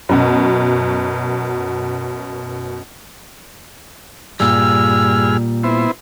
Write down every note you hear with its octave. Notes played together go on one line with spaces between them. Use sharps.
F#2 B2
G2 A#2 G3 G#4 E6 F6
B3 E4 C5